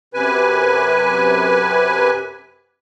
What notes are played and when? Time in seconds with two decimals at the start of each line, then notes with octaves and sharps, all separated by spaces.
0.14 F#2 C3 B4 G#5